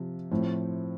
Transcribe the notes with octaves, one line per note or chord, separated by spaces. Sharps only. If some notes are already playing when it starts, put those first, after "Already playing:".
Already playing: C3 F3
A2 F3 C4